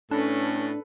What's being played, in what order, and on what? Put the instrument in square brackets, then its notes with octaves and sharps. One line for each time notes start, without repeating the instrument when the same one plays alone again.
[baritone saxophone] A2 [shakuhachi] C#4 [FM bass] D4 [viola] A4 B4